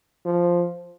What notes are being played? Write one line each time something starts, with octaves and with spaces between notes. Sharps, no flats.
F3